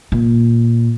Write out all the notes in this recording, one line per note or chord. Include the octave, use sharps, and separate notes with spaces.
A#2